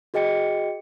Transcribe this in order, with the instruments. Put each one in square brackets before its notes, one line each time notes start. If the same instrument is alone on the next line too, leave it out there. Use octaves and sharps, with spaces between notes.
[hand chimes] F#4 G#4 D#5 G5 C#7